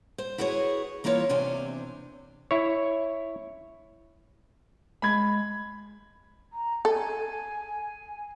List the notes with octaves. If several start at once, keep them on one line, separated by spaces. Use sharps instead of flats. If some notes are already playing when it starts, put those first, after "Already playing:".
C5
E4 F#4 G#4 B4 C#5
E3 A#3 E4 F4 C#5
E2 C3 D4 C5 G#5
E4 C#5
G#3 B5 G#6
A#5
A4 G#5